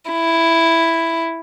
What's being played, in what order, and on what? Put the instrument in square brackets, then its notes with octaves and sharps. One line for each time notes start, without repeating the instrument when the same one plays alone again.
[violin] E4